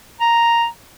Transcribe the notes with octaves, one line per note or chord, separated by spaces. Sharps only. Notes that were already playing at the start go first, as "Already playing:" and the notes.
A#5